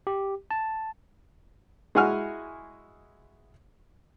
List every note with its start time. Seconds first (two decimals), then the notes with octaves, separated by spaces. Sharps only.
0.07 G4
0.51 A5
1.95 G#3 E4 F#4 F#5 G#5 F6